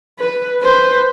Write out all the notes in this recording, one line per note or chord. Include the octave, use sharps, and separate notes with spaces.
B4
B4 C5